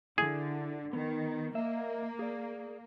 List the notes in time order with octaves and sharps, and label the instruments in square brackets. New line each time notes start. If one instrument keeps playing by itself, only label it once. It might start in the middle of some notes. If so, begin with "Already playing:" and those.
[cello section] D3 [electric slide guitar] E4 [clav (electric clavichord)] G#4
[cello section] D#3 [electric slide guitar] B3
[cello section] A#3 [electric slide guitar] D#5 E5
[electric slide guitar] G#4 D5